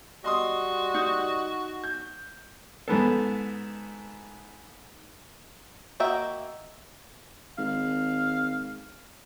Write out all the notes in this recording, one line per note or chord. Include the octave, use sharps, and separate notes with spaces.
G3 F#4 D#5 C6 D#6
D#4
G6
G#2 B3 A4
A#3 F#4 D#5 E5 G5
G#1 F5